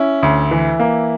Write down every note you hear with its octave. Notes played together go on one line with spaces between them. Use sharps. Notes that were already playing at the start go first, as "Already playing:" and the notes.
Already playing: C#4 E4
D2
E3
A#3